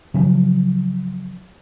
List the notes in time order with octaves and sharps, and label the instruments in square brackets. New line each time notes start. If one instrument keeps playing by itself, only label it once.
[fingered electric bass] C#3 F3 F#3